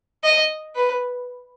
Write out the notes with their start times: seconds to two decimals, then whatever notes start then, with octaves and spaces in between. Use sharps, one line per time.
0.24 D#5
0.75 B4